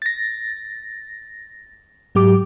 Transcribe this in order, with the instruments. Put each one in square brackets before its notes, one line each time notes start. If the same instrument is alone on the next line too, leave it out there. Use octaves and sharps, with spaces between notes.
[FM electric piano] A6 A#6
G#2 F#3 G4 D6